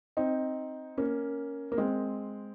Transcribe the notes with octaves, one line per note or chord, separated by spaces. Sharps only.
C4 D#4
A#3 C#4
A#3
G#3 C4